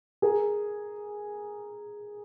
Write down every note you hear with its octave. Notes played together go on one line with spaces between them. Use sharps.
G#4 A#4